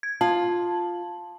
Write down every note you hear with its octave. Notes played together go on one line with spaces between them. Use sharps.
G#6
F4 A5